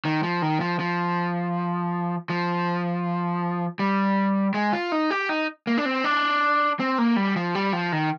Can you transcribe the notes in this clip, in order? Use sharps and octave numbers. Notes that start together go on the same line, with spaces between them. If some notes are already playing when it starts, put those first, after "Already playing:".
D#3
F3
D#3
F3
F3
F3
G3
G#3
F4
D#4
G4
D#4
A#3
D4
C4
D4
C4
A#3
G3
F3
G3
F3
D#3